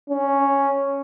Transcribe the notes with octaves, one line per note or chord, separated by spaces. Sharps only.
C#4